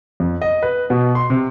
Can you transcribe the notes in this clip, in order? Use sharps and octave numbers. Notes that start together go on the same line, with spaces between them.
F2
D#5
B4
B2
C6
C3